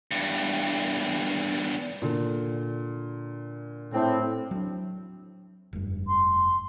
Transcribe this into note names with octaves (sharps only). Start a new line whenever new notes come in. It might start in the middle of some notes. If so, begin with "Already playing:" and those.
E2 G2
A#2 D3
A2 C4
F#3 D4
F1 G2
C6